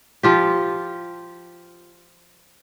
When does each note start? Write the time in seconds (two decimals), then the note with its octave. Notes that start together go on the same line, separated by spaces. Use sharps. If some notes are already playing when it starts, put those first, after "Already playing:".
0.23 F3 F4 G4